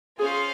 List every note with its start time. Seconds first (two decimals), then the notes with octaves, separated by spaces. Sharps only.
0.19 C#4 F4 G#4 C5 F5